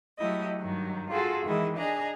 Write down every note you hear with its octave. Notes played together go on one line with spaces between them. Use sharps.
F#3 A3 E4 G4 D#5
G2 D#3 F#3
F4 F#4 G#4 A4
D#3 E3 G#3 E4 D#5
D4 G#4 D#5 A#5